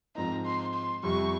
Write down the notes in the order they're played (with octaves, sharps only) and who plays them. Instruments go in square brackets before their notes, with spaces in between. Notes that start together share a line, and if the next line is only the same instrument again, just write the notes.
[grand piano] G#2 F3 C4 D#4 [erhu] A#5
[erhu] C6
C6
[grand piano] F2 C3 G3 [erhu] C#6